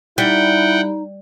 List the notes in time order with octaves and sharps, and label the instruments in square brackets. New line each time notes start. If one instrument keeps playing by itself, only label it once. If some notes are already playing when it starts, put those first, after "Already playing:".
[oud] G3 [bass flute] D#4 [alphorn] E4 [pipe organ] F#5 G5